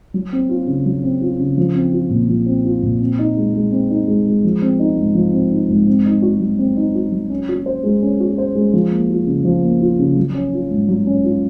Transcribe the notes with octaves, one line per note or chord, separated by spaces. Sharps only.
F#3
C4
F4
C#3
F#3
C4
F4
C#3
F3
C4
F4
A#2
F3
C4
F4
A#2
C4
D#4
G#3
G#3
C4
D#4
G#3
G#3
F3
C4
D#4
G#2
F3
C4
D#4
G#2
C4
D#4
F#4
F#3
C4
D#4
F#4
F#3
C#4
F#4
C5
G#3
C#4
F#4
C5
G#3
F3
A#3
F4
C#3
F3
A#3
F4
C#3
F#3
C#4
F4
G#2
F#3
C#4
F4